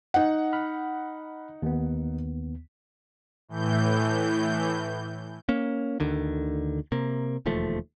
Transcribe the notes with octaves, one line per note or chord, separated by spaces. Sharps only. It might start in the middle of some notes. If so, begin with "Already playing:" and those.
D#4 F#5
B5 F6
D#2 B3
A2 E3 G6
A#3 C#4
D2 D3 D#3
C3 A#3
E1 D#2 F3 A3